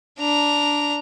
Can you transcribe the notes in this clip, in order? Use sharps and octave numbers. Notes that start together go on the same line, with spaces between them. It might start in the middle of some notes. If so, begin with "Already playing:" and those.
D4 A#5